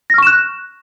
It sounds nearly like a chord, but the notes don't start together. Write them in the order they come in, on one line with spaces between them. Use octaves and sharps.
A#6 F6 C#6 E7 F#6